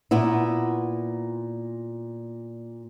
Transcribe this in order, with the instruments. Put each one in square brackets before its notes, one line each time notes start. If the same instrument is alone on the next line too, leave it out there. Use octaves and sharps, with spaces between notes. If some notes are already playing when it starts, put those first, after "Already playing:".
[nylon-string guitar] A#2 B3 E4